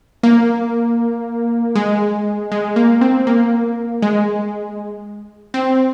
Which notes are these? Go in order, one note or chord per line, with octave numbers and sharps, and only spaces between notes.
A#3
G#3
G#3
A#3
C4
A#3
G#3
C4